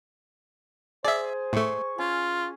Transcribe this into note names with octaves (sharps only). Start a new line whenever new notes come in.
G#4 C5 D5 E5
A2 A3 C#6
C#4 F4